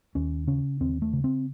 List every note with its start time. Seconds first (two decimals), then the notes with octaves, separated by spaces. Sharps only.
0.15 D#2 C#4
0.47 C#3 C#4
0.80 D#2 C4
1.02 A3
1.13 C#3
1.24 C4